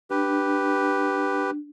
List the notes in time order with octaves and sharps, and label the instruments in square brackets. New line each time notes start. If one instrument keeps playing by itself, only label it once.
[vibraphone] D4 [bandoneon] G4 B4